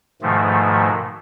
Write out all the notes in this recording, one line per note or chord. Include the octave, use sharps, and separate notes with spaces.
G#2 B2 D#3 F3 A3